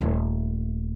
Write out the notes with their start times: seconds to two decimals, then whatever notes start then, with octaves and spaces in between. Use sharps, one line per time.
0.01 D#1 A3